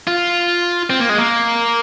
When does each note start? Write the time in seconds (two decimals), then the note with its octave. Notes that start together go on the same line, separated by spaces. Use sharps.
0.07 F4
0.90 C4
1.00 A#3
1.09 G#3
1.18 A#3